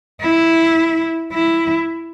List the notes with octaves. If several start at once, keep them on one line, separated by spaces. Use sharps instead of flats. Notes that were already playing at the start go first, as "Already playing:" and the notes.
E4
E4